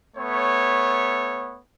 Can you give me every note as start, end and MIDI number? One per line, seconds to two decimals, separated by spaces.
0.17 1.60 57
0.17 1.60 59
0.17 1.60 73